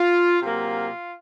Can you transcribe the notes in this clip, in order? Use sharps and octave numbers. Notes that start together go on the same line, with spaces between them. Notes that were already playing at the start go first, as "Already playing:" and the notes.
Already playing: F4
C3 F#3 A#3 F4